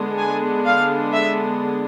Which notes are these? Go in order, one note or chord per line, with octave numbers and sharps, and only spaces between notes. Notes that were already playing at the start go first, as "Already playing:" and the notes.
Already playing: D3 G#3 B3 D4
G#5
F5
E5